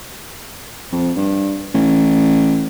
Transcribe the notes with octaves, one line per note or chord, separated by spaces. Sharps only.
F2
G2
A1